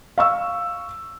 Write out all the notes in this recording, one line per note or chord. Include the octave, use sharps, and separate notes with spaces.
F5 C#6 E6